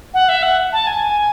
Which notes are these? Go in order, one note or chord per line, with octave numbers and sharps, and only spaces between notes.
F#5
E5
F#5
A5
G#5